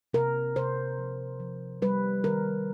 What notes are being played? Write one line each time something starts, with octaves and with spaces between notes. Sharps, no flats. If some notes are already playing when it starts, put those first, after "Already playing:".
C3 A#4
C3 C5
F3
F3
G3 B4
D#3 A#4